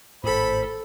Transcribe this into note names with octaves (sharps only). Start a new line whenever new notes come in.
G#1 A2 A4 C5 B5